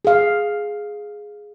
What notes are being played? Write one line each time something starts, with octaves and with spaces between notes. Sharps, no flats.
G#4 F5